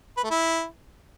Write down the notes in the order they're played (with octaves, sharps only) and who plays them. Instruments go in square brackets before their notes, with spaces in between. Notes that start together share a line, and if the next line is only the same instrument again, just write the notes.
[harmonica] B4
A3
E4